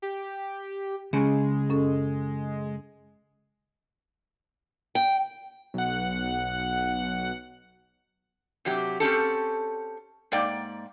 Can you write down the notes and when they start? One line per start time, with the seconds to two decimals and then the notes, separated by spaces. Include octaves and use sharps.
0.02 G4
1.13 C#3 G#3 C#4 G#4
1.70 F#2 C#4 A4
4.95 G5
5.74 B1 F#5
8.65 C3 F#3 G4
9.00 C4 C#4 G4 A4
10.32 G#2 A#3 D5 G5